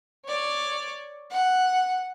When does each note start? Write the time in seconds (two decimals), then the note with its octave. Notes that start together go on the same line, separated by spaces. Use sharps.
0.25 C#5 D5
1.31 F#5